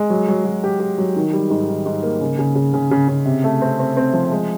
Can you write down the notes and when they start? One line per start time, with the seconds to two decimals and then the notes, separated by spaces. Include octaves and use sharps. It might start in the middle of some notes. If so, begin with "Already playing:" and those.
Already playing: G#3
0.10 F#3
0.28 F#3
0.45 F#3
0.64 G4
0.80 G4
0.98 F#3
1.16 D#3
1.33 G3
1.50 G#2
1.69 D#3
1.86 G#2
2.03 A#3
2.21 C#3
2.39 C#3
2.55 C#3
2.74 C#3
2.91 C#3
3.08 C#3
3.25 C3
3.44 A3
3.62 C4
3.79 C4
3.97 C4
4.14 F3
4.32 G#3